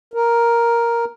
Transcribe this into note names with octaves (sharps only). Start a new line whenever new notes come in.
A#4